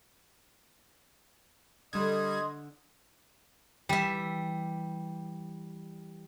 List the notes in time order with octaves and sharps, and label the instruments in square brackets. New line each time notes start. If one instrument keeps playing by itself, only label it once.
[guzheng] D3 [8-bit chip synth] G3 G#6 [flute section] D#5 C6 D#6
[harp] E3 [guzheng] G3 E5